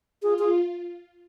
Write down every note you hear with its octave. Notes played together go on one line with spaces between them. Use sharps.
F4 G#4
G#4